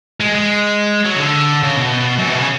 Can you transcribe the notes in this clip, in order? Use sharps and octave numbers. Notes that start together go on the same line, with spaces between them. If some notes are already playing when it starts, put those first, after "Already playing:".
G#3
G#3
F#3
C#3
D3
C#3
B2
F#2
B2
C#3